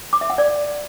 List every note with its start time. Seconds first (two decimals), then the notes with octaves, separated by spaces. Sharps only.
0.13 D6
0.21 E5
0.30 F#5
0.38 D5